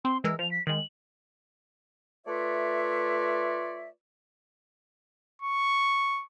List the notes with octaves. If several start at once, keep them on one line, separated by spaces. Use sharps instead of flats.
C4 C6
E3 G#3 A#4 E6
F3 F7
B6
D#3 G#3 F#7
A3 F4 B4 C#5 D5 E5
C#6